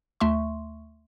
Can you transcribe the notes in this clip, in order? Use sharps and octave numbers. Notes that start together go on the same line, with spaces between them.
D2 A3 E5 C6 C#6